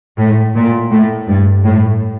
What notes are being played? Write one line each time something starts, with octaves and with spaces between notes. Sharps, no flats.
A2
A#2
A2
G2
A2